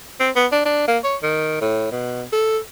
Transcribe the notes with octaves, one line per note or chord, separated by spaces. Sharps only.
C4
B3
D4
D4
A#3
C#5
D#3
A2
B2
A4